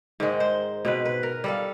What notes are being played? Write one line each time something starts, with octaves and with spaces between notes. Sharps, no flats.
G#2 D#3 G#3
C5
B2 C4 B4
B4
A#4
G3 A4 F5